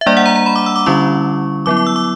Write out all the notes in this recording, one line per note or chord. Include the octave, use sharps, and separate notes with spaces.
E5
G3 A#3 D4 D5
F#5
A#5
A#5
B5
D6
E6
D6
D3 G3 C#4 E4 C#6
F#3 B3 E4 D6
D6
E6
D6